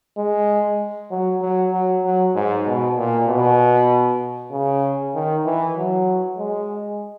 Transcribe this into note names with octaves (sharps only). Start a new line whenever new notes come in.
G#3
F#3
F#3
F#3
F#3
G#2
B2
A#2
B2
C#3
D#3
E3
F#3
G#3